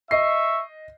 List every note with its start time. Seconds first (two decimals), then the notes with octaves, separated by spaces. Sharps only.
0.11 D#5 E5 C#6 C7